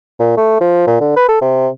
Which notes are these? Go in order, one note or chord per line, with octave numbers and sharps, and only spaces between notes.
A#2
A3
F3
A#2
D3
B4
A4
C3